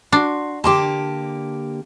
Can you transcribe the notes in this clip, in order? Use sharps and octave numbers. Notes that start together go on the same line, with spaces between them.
D4 F#4 C6
D3 A#3 G4 A5 C6 D6